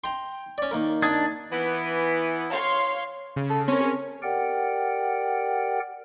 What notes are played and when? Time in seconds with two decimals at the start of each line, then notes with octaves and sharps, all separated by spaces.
0.04 G5 A#5 C6
0.58 C#4 D5
0.71 D#3 A#3 A#4
1.02 D4 D#6 G#6 A6
1.52 E3 B3
2.51 C#5 F5 C6
3.36 C#3
3.50 A4
3.68 C4 C#4 A#4 C#5
3.80 G#4 A#4
4.22 G4 A#4 D5 F#5 G5